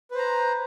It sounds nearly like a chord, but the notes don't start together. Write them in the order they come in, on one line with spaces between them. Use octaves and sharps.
B4 C5 A#5